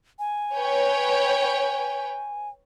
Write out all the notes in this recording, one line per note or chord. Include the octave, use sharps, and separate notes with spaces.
G#5
B4 C#5 G5